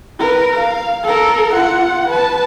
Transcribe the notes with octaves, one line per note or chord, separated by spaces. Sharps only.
A#4 B4
F5
A4 A#4
F4 F#5
B4 A5